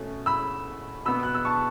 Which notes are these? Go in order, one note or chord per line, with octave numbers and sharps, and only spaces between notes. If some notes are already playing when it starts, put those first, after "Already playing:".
Already playing: B2 A3 C#4
B5 E6
B2 B3 B5 E6
F#6
E6
A5 C#6